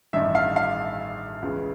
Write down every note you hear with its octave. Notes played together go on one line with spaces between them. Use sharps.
A1 G2 D#3 E5
F5
F5
C#2 C#3 E3